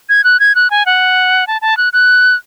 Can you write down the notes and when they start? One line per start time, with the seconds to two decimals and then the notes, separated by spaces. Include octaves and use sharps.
0.09 G#6
0.24 F#6
0.40 G#6
0.55 F#6
0.71 G#5
0.86 F#5
1.47 A5
1.62 A5
1.77 F#6
1.93 F#6